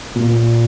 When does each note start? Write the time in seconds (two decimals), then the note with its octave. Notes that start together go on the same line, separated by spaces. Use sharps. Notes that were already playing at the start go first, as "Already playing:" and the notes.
0.16 A#2